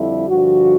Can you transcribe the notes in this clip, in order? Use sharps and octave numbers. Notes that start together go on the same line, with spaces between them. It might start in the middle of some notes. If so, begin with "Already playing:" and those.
Already playing: F2 D3 G3 E4
G2 D3 F3 F#4